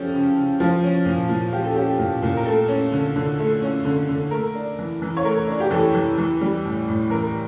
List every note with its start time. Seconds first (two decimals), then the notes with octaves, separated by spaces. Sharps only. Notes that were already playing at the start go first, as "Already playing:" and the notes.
Already playing: F3 C#4 G4 A4
0.14 C#3
0.36 C#3
0.60 F3
0.84 C#4
1.06 A#2
1.29 A#2
1.52 F3 G4
1.65 A4
1.76 C#4 G4
1.99 A#2
2.22 A#2
2.37 A#4
2.46 A3 A4
2.68 C#4
2.92 D3
3.16 D3
3.39 A3
3.62 C#4
3.85 D3
4.09 D3
4.31 A3 A#4
4.55 D4
4.79 E3
5.02 E3
5.17 C#5
5.24 A3 A#4
5.48 D4
5.60 G4
5.71 E3 A4
5.95 E3
6.18 E3
6.41 G3
6.64 A2
6.88 A2
7.10 E3 A#4